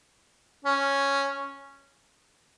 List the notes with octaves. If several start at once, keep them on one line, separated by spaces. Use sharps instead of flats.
C#4